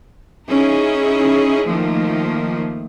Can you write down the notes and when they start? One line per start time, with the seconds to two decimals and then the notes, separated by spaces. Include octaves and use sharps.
0.48 C#4 D#4 E4 G#4
1.66 D#3 F3 A3 A#3